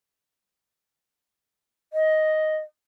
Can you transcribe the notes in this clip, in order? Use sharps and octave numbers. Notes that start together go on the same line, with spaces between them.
D#5